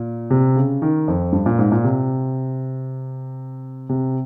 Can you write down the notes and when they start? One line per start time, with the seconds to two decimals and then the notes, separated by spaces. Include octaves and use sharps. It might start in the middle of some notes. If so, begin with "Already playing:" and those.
Already playing: A#2
0.31 C3
0.56 C#3
0.82 D#3
1.08 F2
1.33 G2
1.46 A#2
1.59 G#2
1.72 A#2
1.84 C3
3.89 C3